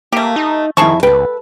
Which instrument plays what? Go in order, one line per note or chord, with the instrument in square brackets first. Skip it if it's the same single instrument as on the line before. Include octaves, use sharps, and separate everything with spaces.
[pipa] A3 G4 [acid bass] A#3
[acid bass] D#4
[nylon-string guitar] F2 E4 [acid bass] D#3 [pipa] G#4 A5 C#6
[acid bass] C#2 [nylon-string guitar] A4 B4 [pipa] G5